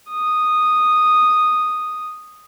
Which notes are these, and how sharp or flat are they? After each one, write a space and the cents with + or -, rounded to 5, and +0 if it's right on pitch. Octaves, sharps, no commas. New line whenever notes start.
D#6 -5